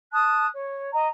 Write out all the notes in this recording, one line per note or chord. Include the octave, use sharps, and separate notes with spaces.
A5 D#6 F#6
C#5
D#5 A#5